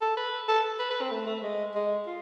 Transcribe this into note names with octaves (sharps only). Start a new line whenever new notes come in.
A4
B4
A4
B4
B4
C4
A3
A3
G#3
G#3
F4